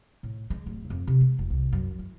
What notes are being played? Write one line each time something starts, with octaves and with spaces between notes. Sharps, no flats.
A2
G#3
D1
F2
C3
G#3
E1
C2
F#2
E3